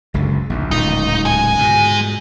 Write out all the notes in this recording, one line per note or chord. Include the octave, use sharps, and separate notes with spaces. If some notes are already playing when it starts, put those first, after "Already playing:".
F#1 C#2 D3
A#1 D#2
D1 C#2 A#2 D#4
G#3 G#5
G#2 B2